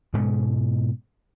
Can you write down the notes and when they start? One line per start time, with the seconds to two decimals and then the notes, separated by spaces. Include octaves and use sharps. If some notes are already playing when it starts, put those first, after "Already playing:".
0.14 G#2 B2 G#3 C#4